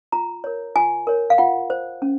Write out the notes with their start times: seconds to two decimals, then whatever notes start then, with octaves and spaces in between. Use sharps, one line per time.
0.12 F4 A#5
0.44 A#4 C#5
0.76 F4 G#5
1.07 A#4 C#5
1.30 F5
1.38 F4 F#5
1.70 C5
2.02 C#4